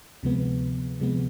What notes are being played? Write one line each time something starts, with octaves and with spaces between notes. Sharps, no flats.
D2 C3 F3 G#3 B3
D2 C3 F3 G#3 B3